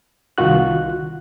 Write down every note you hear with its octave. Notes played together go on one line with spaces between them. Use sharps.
C2 D#3 F4 F#4 F#6